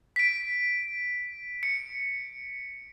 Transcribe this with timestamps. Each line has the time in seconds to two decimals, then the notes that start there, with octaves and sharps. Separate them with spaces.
0.16 B6 D7
1.63 C#7